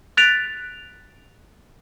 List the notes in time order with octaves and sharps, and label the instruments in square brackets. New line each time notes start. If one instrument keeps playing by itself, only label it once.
[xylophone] F#6 A6 B6 D7 F7